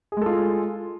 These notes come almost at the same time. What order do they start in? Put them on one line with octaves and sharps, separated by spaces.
G#4 G#3 A4 F4